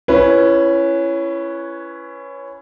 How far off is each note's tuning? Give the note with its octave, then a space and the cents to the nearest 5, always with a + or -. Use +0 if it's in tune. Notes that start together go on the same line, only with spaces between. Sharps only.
C#4 +0 E4 +30 B4 -5